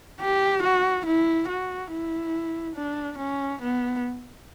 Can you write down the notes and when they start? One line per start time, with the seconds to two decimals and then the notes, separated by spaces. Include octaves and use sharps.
0.20 G4
0.63 F#4
1.06 E4
1.48 F#4
1.91 E4
2.76 D4
3.18 C#4
3.62 B3